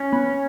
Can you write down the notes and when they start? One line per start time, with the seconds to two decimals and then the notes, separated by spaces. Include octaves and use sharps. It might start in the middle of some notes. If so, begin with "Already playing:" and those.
Already playing: C#4
0.13 B3